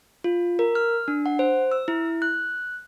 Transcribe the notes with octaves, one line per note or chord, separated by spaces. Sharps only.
F4
A#4
F6
D4
F#5
C5
E6
E4
F#6